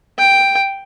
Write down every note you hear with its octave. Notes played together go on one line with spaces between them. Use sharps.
G5